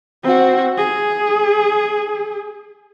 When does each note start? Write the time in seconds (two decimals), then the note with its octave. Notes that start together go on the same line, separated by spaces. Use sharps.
0.23 C4 F#4
0.78 G#4